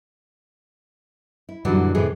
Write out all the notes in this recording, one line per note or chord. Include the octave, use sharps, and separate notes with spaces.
E4
F#2 A#2 D3 E3 F#3 G3
F2 A2 C3 E3 A3 G#4